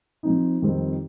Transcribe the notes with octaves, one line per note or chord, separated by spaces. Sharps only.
C3 F3 C4 D#4
F2 D#3 G3 C4 G4